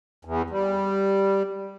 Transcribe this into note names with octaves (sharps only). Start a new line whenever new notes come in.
E2
G3